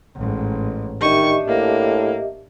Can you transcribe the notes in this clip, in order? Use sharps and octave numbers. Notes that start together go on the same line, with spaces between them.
A1 G#2
D#3 D4 G4 D#5 E5 C#6
A2 A#3